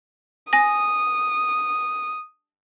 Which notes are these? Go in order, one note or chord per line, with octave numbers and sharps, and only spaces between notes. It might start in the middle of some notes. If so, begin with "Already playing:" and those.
G#5 D#6 A#6